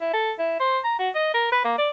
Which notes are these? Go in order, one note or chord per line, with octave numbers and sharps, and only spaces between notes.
E4
A4
E4
C5
A#5
F#4
D#5
A#4
B4
A#3
D5